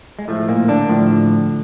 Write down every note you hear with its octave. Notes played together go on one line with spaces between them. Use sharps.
G#3
A2 F3 A3
A#2 A#3
D3 D4
A2 F3